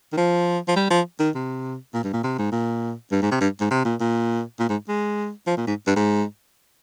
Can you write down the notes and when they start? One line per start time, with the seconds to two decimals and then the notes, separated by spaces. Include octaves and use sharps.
0.13 D#3
0.17 F3
0.68 F3
0.76 G3
0.91 F3
1.19 D#3
1.35 C3
1.94 A#2
2.04 G2
2.13 A#2
2.24 C3
2.38 G#2
2.52 A#2
3.12 G2
3.22 G#2
3.31 C3
3.41 G2
3.60 G#2
3.71 C3
3.85 A#2
4.01 A#2
4.59 A#2
4.69 G#2
4.89 G#3
5.47 F3
5.57 A#2
5.67 G#2
5.87 G2
5.96 G#2